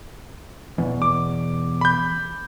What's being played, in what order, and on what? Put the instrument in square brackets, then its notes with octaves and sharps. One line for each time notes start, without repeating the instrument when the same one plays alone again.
[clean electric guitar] E2 B2
[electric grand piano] D6
B5 G6